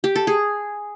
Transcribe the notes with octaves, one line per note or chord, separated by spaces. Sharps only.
G4
A4
G#4